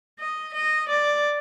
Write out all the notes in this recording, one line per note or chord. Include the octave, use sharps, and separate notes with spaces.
D#5
D#5
D5